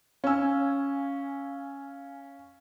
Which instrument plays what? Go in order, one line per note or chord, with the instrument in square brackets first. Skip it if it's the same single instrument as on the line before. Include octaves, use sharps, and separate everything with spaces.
[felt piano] C#4 E6 [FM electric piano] F5 G#5